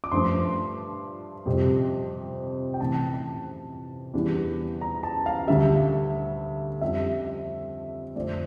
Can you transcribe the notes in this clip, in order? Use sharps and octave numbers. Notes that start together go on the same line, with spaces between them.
D6
G2 F3 A3 D4 C6
F2 C3 G3 C4
G5
C3 E3 A3 A5
A5
E2 E3 G3 D4
A#5
A5
F5
D2 D3 G3 E5
F2 D3 G3 D4 E5
F2 D3 A3 C4 D5